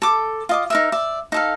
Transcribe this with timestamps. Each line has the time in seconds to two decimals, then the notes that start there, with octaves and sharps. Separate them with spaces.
0.02 A4 D6
0.49 F4 D#5 D6
0.70 D#4 A#4 E5
0.92 D5 E5
1.32 D#4 A4 F5